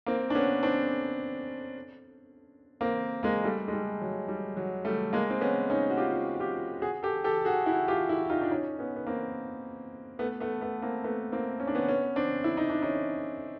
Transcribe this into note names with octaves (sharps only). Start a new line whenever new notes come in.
A#3 C4
D4
B3 C#4
C4 D4
A#3 C4
G#3 A#3
G3 A3
G#3
G3
F#3
G3
F#3
G3 A3
G#3 A#3
C4
B3 C#4
C#4 D#4
F#4
F4 G4
F#4
F4 G4
F#4 G#4
G4 A4
G4 A4
F#4 G#4
E4 F#4
F4 G4
E4 F#4
D#4 F4
D4
C#4 D#4
B3 C#4
B3
A#3 C4
A3 B3
A3 B3
A3 B3
A#3 C4
A3 B3
A#3 C4
C#4
D4
B3 C#4
B3 C#4
C4 D4
E4
D#4
D4
C#4 D#4